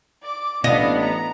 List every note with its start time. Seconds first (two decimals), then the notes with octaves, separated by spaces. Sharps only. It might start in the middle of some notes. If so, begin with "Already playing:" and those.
0.22 D5 D6
0.64 A1 B3 D4 E4 D#5 F5
1.01 A#5